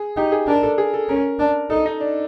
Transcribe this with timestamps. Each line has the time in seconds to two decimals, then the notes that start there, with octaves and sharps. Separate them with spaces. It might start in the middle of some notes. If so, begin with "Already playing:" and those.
Already playing: G#4
0.16 D#4 G4
0.32 G#4
0.47 D4 A#4
0.63 A4
0.78 G#4
0.94 A4
1.09 C#4 A#4
1.39 D4
1.70 D#4 A4
1.86 D#4
2.00 D4